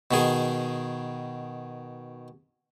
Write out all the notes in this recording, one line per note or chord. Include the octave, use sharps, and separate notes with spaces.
B2 D#3 G#4